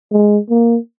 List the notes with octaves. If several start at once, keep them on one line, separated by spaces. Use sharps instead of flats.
G#3
A#3